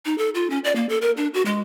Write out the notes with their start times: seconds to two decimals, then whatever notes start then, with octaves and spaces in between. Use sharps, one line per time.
0.05 D#4
0.18 A4
0.35 F4
0.50 C#4
0.64 D5
0.76 A#3
0.89 A4
1.02 A#4
1.17 D4
1.34 F#4
1.46 G#3